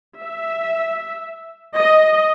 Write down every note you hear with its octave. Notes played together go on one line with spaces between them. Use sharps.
E5
D#5